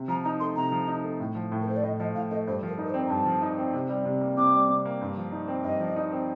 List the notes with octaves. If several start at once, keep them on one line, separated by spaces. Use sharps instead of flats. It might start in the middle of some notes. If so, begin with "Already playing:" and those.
Already playing: C3
F3 A#5
D#4 A#5
A3 C6
C3 A#5
F3
D#4
A3
A2
F3
A2
A#4
A3 C5
D5
A2 D#5
F3 D#5
A2 F5
A3 D#5
G2 C5
F3 A#4
D#4
A#4
C5
C4
A#5
G2 A5
F3
D#4
C4
C3
G3
C3
A#3
C3 D6
G3
C3
A#3
G2
F3
D#4
C4
G2 D#5
F3
D#4
C4